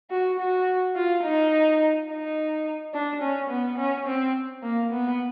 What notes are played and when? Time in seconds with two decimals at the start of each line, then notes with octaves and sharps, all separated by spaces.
0.11 F#4
0.39 F#4
0.96 F4
1.24 D#4
2.09 D#4
2.93 D4
3.22 C#4
3.50 B3
3.78 C#4
4.07 C4
4.63 A#3
4.92 B3